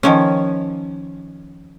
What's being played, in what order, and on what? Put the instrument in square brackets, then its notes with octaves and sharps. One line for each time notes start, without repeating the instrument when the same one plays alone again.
[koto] D#3 F3 C#4